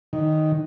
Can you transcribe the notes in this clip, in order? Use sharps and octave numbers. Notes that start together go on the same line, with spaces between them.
D#3